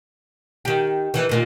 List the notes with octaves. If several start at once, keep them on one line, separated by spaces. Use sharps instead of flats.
D#3 G4
D#3 E3
A#2 D#3